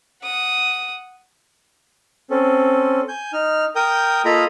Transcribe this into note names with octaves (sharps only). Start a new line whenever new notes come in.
F#5 D#6
C4 C#4 A4
G#5 G6
D#4 F6
A#4 G5 D#6 G6
A#3 F4 A4 D#5 A#5 B5